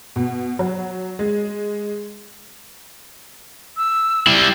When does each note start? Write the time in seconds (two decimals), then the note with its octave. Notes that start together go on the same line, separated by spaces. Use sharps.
0.16 B2
0.59 F#3
1.19 G#3
3.77 E6
4.27 G3 E4